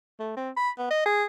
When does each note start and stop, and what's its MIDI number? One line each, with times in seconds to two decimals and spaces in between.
0.20 0.35 57
0.37 0.50 60
0.57 0.70 83
0.78 0.88 59
0.90 1.02 75
1.06 1.24 68